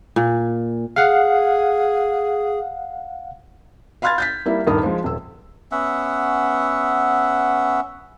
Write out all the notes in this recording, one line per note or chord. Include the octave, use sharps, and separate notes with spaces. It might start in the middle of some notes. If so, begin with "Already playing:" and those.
A#2
G#4 F5 F#5
F5 B5 C6 F6 G#6 A6
G6 A6 B6
G3 A#3 E4
D#1 G2 D#3 A#4 D#6
F3 G#3
D#1 E6
B3 C#4 E5 F#5